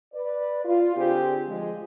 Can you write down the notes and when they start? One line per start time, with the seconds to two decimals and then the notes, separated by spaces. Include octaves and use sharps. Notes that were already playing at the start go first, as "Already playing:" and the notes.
0.13 B4 D5
0.65 F4
0.96 D3 C4 G4 G#4 C5
1.48 F3 G#3